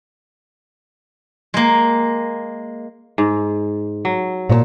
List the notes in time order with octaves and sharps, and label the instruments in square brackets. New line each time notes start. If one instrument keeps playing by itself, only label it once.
[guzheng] G#3 A#3
[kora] G#2
F#3
[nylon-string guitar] A#2 C#5 A5